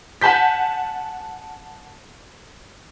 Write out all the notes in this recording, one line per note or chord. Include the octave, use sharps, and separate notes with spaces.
F#5 G#5 A5 G6 B6